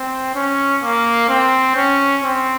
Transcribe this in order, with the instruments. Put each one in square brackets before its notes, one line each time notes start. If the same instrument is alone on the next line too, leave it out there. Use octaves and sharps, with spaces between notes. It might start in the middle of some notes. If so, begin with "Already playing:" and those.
Already playing: [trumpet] C4
C#4
A#3
C4
C#4
C4